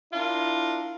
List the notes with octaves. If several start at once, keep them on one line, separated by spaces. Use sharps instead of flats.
D4 E4 F4 A#4